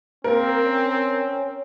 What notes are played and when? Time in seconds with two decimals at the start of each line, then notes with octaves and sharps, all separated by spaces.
0.24 A#3 C4 A#4
0.64 C#4